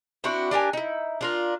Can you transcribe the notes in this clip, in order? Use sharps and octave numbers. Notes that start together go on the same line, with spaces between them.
C4 D4 E4 F#4
D4 G4 A#4 G#5
D#4 E4
D4 F4 A#4